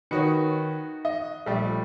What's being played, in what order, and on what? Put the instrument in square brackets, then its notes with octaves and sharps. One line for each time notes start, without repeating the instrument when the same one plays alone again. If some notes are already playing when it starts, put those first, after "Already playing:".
[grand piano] D#3 B4 C#7 [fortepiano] D#4 F#4 C#5
[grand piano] D#5
[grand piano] A#1 [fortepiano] G3 A3